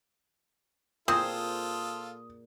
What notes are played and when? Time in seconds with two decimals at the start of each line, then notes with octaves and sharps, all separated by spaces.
1.08 A#2 C4 F4 G#4 A4 C5 D#6